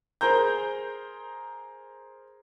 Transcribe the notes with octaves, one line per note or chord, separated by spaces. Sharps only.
G#4 A#4 C5 A#5 G6